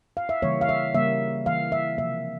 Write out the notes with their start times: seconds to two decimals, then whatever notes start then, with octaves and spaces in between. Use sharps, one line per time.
0.17 F5
0.29 E5
0.42 C#3 E3 G3 A#3 C#5
0.61 F5
0.69 E5
0.94 C#3 G3 A#3 E5
1.46 E3 A#3 F5
1.72 E5
1.97 C3 F3 A#3 E5